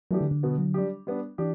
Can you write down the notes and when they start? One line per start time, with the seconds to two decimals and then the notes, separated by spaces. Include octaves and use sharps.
0.11 E3 F#3 A3 D4 G4
0.21 D3
0.31 D3
0.43 B2 F#3 B3
0.58 F#3
0.74 G3 D4 G4
1.07 G3 B3 D4
1.38 E3 D4 G4